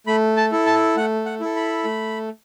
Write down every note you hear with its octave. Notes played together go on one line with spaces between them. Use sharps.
A3 B5
A5
E4 A4
A5
A3 F#5
F#5
E4 A4
B5
A3